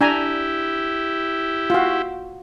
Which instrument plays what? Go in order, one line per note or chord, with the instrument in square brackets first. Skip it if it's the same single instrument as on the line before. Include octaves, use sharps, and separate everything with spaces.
[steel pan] D4 G#5 A#5 [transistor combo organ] E4 G4
[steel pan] F4 F#4